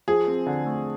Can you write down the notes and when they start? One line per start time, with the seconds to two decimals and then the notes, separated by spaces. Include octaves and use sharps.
0.08 F3 G#4
0.28 C4
0.47 D3
0.66 A3